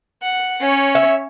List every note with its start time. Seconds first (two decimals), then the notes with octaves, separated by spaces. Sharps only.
0.22 F#5
0.61 C#4 C#5
0.95 E5